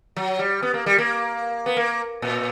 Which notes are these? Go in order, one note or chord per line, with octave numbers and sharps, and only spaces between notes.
F#3
G3
B3
A#3
G3
A#3
B3
A#3
A#2